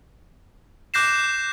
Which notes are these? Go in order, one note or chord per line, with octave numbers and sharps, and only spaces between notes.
D6 F#6 G6 A#6 C7 E7